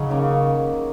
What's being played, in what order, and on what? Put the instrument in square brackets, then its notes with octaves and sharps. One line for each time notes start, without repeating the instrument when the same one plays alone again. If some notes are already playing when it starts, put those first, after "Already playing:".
Already playing: [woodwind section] C#3 [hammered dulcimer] F#3 D#4
[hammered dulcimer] D#3 A#3 C#4